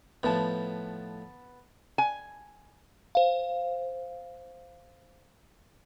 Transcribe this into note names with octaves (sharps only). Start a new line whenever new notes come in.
A2 F3 B3 A5
G#5
C5 F5